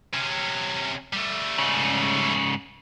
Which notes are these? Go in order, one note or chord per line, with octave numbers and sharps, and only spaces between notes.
C3 C#4
G3 A3
G#2 C#3